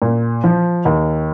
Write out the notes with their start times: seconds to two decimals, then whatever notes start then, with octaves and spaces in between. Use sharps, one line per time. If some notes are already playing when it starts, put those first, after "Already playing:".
0.02 A#2
0.44 F3
0.85 D#2